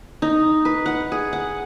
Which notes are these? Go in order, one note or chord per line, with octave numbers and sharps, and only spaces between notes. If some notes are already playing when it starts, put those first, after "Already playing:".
D#4
B4
F#5
G#4
F#5